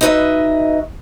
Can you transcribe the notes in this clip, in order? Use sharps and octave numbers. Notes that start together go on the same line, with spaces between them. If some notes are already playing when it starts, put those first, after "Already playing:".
D#4 F#4 B4 D#5 E5